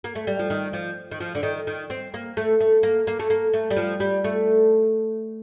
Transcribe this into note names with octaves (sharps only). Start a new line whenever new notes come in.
A#3
A3
G3
F3
D#3
F3
D#3
F3
D3
D#3
D#3
C4
A#3
A3
A3
A#3
A#3
A3
A#3
A3
G3
F3
G3
A3